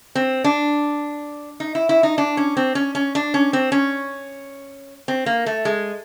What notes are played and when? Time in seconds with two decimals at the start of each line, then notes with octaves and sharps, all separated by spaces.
0.15 C4
0.44 D4
1.60 D#4
1.75 E4
1.89 E4
2.03 D#4
2.18 D4
2.37 C#4
2.57 C4
2.75 C#4
2.95 C#4
3.15 D4
3.34 C#4
3.53 C4
3.72 C#4
5.08 C4
5.26 A#3
5.46 A3
5.65 G#3